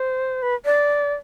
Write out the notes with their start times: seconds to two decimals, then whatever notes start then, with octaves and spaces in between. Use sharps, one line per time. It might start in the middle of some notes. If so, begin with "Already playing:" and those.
Already playing: C5
0.42 B4
0.65 D5